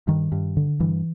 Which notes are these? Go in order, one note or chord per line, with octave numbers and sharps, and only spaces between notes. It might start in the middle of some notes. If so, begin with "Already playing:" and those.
G2 D#3
G2
D3
G2 E3